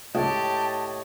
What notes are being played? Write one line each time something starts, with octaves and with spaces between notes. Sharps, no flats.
C#2 A2 G4 C#5 D#5 A5